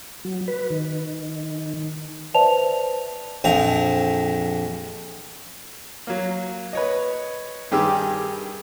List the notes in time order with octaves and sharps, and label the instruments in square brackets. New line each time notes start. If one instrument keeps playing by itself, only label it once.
[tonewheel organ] F#3
B4
D#3
[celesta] B4 C5 D5 E5 A5 F7
[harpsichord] A#1 F2 A#5
[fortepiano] F#3 A#3
B4 C#5 D#5
G2 D#3 G4 G#4 D6 E6